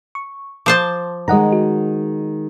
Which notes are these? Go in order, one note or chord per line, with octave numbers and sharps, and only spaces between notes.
C#6
F3 C5 A5 D6
D#3 G#3 D#5 F#5 A#5
F#4